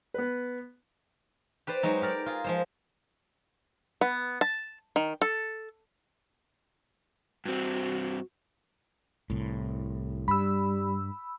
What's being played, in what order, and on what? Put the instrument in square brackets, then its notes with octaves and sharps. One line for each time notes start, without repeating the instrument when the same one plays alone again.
[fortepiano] B3 B4
[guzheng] G4 B4 C5 D5
F#3 G#3 D#4
G4 A#4 D5
F4 G#4
F3 G#3 C5
[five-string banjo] B3
A5
D#3
A4
[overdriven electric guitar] G2 C4 [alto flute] F#4
[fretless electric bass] C2 A2
[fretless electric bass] G2 [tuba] G3 [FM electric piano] B5 E6